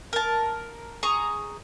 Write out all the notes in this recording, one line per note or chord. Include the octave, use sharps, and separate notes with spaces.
A#4 A5
G#4 A#5 C#6 D#6